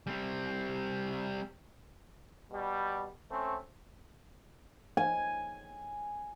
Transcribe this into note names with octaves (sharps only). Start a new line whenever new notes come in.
G3 C4
B2 G3
A3 C4 C#4
G#5